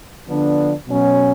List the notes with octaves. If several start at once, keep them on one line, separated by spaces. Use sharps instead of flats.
D3 F3 B3 D4
B2 F#3 C#4